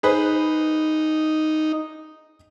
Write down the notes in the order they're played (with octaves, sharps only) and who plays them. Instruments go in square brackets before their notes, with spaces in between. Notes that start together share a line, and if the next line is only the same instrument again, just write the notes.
[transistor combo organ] D#4 [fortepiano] G#4 B4 C5